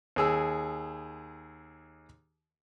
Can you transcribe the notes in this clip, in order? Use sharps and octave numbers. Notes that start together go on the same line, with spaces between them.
D#2 G#4 E6